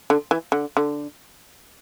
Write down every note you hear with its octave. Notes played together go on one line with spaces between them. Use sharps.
D3
E3
D3
D3